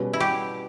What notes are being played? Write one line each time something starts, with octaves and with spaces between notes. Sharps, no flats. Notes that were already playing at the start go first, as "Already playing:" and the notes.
Already playing: B2 G3 C#4 G#4 B4
E4
G4